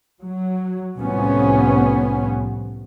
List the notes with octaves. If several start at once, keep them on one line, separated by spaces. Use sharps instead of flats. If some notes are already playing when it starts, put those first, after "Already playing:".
F#3
C2 A2 F3 B3 C#4